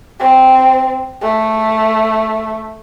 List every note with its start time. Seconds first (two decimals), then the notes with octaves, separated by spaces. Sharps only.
0.20 C4
1.22 A3